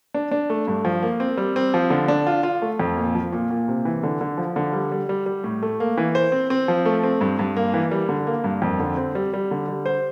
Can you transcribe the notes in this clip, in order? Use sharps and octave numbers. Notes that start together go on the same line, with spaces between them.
D4
D4
A3
G2
F3
A#3
C4
G3
C4
F3
D3
D4
F4
F4
A3
F2
A#2
F3
A#2
A#2
C3
E3
D3
D3
F3
D3
G3
G3
G3
G3
A2
A3
A#3
E3
C5
C4
C4
F3
A3
C4
G2
G2
A#3
E3
G3
D3
A#3
G2
F2
D3
C4
G3
G3
D3
G3
C5